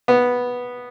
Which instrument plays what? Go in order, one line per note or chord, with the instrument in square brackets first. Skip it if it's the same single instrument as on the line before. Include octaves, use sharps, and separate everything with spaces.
[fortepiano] B3